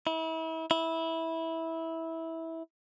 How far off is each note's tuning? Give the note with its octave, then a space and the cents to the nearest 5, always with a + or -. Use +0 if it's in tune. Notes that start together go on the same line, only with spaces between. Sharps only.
E4 -35
E4 -15